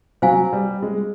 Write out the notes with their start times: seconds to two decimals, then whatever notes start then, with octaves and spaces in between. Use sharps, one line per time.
0.22 F#3 C5 F5 G#5
0.53 G3
0.82 G#3